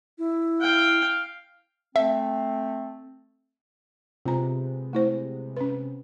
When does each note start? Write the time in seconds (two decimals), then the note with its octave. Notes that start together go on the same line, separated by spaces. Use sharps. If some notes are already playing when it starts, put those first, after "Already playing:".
0.18 E4
0.61 F5 G5
1.96 A3 C4 E5
4.25 C3 G#3 B3 F4 A#5
4.93 A3 E4 C5
5.57 C#4 B4